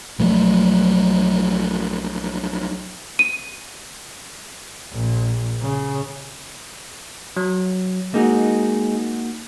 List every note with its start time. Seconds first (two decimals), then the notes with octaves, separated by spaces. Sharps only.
0.19 B1 F3 F#3 A3
3.19 D#7
4.92 A#1
5.61 C#3
7.37 F#3
8.14 G#3 A#3 D#4 F#4 G#4